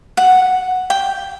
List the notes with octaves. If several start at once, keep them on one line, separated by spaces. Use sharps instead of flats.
F#5
G5